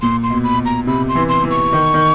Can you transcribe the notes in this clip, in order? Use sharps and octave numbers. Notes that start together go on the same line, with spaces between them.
A#2 C6
C6
B2
B5
B2
A#5
C3 B5
C6
E3
C6
E3
C#6
D#3
D#3